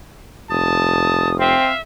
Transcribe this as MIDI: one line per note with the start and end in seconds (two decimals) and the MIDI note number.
0.50 1.56 29
0.50 1.31 81
0.50 1.39 87
1.40 1.69 60
1.40 1.81 76
1.40 1.75 77